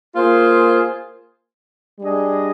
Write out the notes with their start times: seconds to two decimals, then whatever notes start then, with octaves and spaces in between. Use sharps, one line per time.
0.16 A#3 F4 G#4 C5
2.00 G3 D4 G#4 D#5